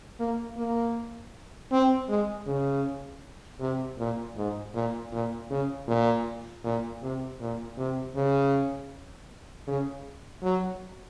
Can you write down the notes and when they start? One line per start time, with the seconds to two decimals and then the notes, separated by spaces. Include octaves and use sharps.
0.20 A#3
0.57 A#3
1.72 C4
2.09 G#3
2.46 C#3
3.60 C3
3.99 A#2
4.36 G#2
4.74 A#2
5.13 A#2
5.50 C#3
5.87 A#2
6.64 A#2
7.02 C3
7.40 A#2
7.78 C3
8.16 C#3
9.67 C#3
10.43 F#3